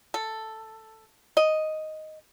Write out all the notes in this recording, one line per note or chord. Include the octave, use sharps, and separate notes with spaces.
A4
D#5